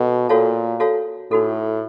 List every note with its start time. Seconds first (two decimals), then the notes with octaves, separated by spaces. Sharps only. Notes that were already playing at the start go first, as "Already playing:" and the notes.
Already playing: B2 A4
0.29 A#2 F#4 A4 C#5 F5 A5
0.80 F#4 A4 C#5 F5 A5
1.31 A2 D#4 F#4 A4